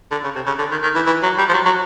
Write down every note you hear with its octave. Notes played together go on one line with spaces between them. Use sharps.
D3
C#3
C3
C#3
D3
D#3
D#3
E3
E3
F#3
G3
F3
F#3
F#3